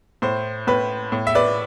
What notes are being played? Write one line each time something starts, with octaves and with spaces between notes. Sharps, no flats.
A2 C5
A2 B4
A2
E5
B4 D5